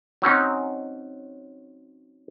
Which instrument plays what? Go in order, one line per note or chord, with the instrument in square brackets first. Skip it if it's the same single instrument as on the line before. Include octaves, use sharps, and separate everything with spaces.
[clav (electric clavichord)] F#3 C4 C#4 D#4